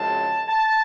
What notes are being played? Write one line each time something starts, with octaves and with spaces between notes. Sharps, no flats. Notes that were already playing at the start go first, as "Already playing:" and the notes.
Already playing: F#2 C#3 F3 G#3 C4 A5
A5